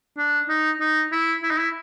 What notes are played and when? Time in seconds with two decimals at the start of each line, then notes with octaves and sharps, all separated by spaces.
0.17 D4
0.49 D#4
0.80 D#4
1.12 E4
1.43 E4
1.51 D#4
1.59 E4